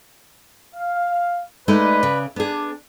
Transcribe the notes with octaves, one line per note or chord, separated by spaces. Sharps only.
F5
G#3 A3 D#4 B4 D5
C#3
B3 D4 G#4